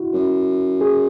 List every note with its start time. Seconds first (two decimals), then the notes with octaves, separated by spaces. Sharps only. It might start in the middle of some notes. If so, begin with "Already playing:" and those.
Already playing: E4 F#4
0.13 F#2
0.81 G#4